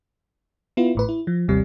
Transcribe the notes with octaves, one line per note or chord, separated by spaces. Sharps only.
B3 E4 F4
A1 A2 B4
E4
F3
G#1 D#2 C3 G3